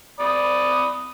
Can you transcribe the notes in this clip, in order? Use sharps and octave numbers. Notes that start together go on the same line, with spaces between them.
D5 B5 D#6